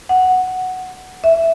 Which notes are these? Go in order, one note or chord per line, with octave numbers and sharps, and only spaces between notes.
F#5
E5